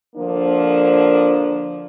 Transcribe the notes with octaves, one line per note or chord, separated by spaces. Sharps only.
D3 F3 A#3 D4